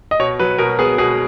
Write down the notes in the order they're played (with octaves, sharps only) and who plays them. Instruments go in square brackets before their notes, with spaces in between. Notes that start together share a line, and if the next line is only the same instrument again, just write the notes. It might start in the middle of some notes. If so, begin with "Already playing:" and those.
[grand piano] D#5
B2 C#5
F#3 B4
B2 A#4
B3 G#4
B2 G#4